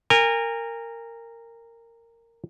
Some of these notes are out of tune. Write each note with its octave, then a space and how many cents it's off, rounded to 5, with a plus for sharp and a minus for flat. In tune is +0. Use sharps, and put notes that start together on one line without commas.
A#4 -15 G#5 -35